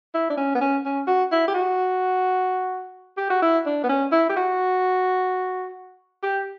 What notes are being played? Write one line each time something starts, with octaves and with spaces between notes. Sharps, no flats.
E4
D4
C#4
B3
C#4
C#4
F#4
E4
G4
F#4
G4
F#4
E4
D4
B3
C#4
E4
G4
F#4
G4